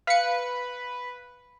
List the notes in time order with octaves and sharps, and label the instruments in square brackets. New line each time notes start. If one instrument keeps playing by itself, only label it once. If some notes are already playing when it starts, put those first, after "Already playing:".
[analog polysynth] B4 [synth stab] F5 C#7